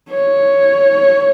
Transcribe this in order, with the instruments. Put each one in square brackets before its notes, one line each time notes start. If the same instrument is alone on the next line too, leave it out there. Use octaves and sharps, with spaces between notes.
[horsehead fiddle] C#5